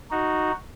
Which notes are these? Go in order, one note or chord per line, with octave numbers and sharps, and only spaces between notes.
D#4 F#4